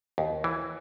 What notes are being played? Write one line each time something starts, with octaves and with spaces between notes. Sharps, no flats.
D#2
E3